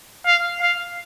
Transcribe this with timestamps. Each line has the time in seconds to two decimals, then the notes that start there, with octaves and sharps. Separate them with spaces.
0.26 F5
0.61 F5